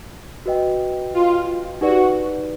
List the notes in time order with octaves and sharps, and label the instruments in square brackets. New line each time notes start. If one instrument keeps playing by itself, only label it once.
[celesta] F#4 B4 D#5 G5
[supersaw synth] F4
[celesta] D#4 G4 B4 D5 [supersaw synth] F#4